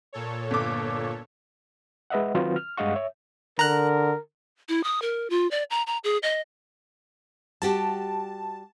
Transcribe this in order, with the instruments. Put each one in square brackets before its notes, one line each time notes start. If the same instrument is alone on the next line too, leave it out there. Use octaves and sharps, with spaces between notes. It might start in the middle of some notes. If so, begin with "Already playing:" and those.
[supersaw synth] A#2 A4 C#5
[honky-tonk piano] G1 D6
[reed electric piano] G#3 B4 D#5 E5 F#5
D#3 F#3 C4 F4 F#4 B4
F6
G2 G#3 D#5 F5 F#5 C#6
C#5 E5
[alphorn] D3 [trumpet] A#4 [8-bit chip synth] A#5 F#6
[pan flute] E4
D#6
A#4
F4
D5
A#5
A#5
G#4
D#5
[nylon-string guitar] G3 F#4 G4 [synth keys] A5